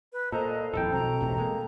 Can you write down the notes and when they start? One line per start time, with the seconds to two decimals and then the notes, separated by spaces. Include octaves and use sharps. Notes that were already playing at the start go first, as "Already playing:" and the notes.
0.13 B4
0.32 A#2 A4 C5 D#5 A#5
0.73 D#1 A#1 F2 E4 A4 G5
0.92 B1 B2 C4 A#5
1.21 E1 A1 C3
1.38 G#3 A#3